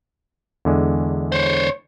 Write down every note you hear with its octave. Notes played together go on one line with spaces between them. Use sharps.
E2 D3 G#3
C5 C#5